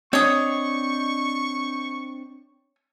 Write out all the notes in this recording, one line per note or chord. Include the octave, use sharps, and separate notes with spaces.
C4 D4 C#5 D#5 C#6 D#6